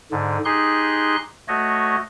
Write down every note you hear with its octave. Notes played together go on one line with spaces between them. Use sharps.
G#2 D3
D#4 G4 G#4 C6 F#6
A3 F#4 C#5 D#5